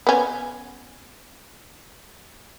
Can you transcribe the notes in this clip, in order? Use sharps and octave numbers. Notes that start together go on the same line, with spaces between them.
B3 C#4